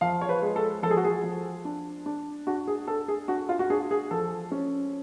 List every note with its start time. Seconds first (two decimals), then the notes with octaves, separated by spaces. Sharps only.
0.01 F3 F5
0.21 C#5
0.29 B4
0.42 G#3
0.56 A4
0.83 F3 A4
0.91 G#4
0.97 F#4
1.05 G#4
1.23 F3
1.65 D4
2.06 D4
2.47 D4 F#4
2.67 G#4
2.88 D4 A4
3.08 G#4
3.28 D4 F#4
3.49 F4
3.59 F#4
3.70 D4 G#4
3.91 G#4
4.11 F3 A4
4.52 C#4